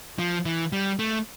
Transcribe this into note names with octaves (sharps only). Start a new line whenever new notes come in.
F3
E3
G3
A3